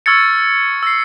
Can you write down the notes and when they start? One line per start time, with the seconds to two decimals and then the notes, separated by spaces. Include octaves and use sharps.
0.06 C#6 E6 F6 G#6 A6 C#7
0.83 E6 A#6 C7